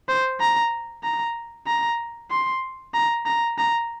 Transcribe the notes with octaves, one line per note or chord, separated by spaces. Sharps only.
C5
A#5
A#5
A#5
C6
A#5
A#5
A#5